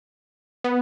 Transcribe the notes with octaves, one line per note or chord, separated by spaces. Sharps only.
B3